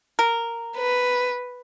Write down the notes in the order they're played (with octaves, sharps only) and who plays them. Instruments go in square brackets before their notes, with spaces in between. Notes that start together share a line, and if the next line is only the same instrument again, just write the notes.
[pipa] A#4
[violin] B4